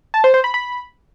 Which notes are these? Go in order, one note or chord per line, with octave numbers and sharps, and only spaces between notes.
A5
C5
C5
B5
B5